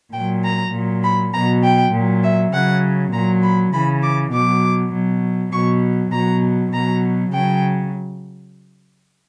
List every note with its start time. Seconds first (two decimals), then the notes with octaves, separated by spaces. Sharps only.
0.13 A#2 F#3 G5
0.43 A#5
0.73 A#2 F#3
1.03 B5
1.33 B2 F#3 A#5
1.63 G5
1.93 A#2 F#3
2.23 E5
2.52 C#3 F#3 F#5
3.12 A#2 F#3 A#5
3.42 B5
3.72 C#3 E3 B5
4.02 D6
4.32 B2 F#3 D6
4.92 B2 F#3
5.52 B2 F#3 C#6
6.12 B2 F#3 A#5
6.72 B2 F#3 A#5
7.31 C#3 F#3 G5